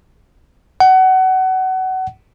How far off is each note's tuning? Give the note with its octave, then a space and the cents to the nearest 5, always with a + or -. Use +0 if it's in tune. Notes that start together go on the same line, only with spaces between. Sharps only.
F#5 +25